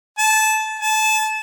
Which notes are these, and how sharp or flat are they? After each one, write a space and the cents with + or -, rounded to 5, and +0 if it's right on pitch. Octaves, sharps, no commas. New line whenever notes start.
A5 -20
A5 -25